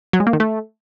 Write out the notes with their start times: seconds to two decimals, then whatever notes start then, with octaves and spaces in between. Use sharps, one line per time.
0.13 F#3
0.20 G#3
0.27 A#3
0.33 D#3
0.40 A3